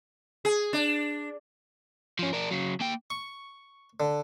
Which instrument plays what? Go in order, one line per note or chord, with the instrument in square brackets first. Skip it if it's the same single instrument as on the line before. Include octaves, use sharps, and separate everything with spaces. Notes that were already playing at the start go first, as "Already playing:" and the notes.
[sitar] G#4
D4
[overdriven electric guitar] F3 C#4
D4 A#4
C#3 F#3
A#3 G5
[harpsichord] C#6
D3